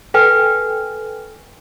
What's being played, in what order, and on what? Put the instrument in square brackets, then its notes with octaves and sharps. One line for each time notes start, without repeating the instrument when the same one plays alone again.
[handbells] A4 B4 G5 G#5 F6